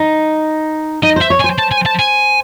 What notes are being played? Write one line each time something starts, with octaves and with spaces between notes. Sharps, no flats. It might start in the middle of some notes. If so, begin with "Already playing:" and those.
Already playing: D#4
D#4 D#5
C5
E5
C#5
G#5
C5
A5
G#5
A5
G#5